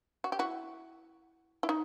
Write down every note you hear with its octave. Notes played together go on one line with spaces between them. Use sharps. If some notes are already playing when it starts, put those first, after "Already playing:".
F#4
G4
E4 F#4
E4
D#4